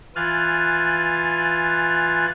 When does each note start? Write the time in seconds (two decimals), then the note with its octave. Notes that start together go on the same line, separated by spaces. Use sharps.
0.15 E3 F4 G#5 F6 F#6 A6